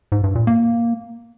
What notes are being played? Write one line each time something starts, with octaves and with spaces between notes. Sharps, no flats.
G#2
G2
A#2
A#3